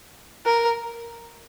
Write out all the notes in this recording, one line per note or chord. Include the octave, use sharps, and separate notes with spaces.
A#4